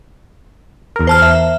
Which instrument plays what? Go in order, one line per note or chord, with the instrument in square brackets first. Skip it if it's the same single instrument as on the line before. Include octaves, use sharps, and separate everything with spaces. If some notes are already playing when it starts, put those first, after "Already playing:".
[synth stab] E2 A#4
[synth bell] C5 A5 F6
E5